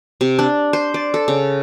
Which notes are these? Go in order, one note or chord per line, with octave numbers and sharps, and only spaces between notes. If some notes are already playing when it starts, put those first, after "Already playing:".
C3
D4
C5
D5
A4
C#3